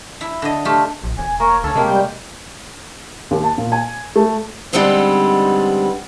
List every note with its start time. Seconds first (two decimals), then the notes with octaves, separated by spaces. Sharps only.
0.21 E4
0.42 D3 D#5
0.65 A3 F4 G4
1.04 A#1
1.18 E1 G#5
1.40 A#3 C#5 A#5
1.64 D2 C#4 A4 A5
1.75 C3 G#3 A#3 G4
1.88 G3 G6
3.31 D#2
3.44 A5
3.58 A#2
3.72 G#5
4.16 A3
4.73 D3 G3 G#3 B3 C4 D#4